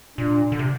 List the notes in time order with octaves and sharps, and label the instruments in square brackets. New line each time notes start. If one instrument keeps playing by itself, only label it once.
[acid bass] A#2 [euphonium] D4
[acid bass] D3
C3